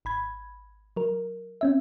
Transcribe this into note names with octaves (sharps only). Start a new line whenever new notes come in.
G#1 B5 G#6
F#3 A#4
C4 C#4 E5